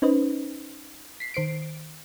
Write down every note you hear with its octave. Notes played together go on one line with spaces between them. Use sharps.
C#4 D#4 B4 C5 D#5
B6 C7
D#3 C5 C7 D7